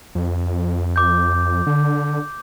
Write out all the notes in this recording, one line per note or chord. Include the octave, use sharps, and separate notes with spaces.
F2
D6 G6
D3